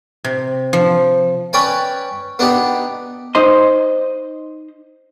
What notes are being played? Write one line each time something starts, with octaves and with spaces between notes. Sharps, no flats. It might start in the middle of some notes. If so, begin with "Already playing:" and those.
C3
F3
C#4 B4 D5 G5 G#5
B3 D4 D#4 G4
D#4 C5 D#5 C6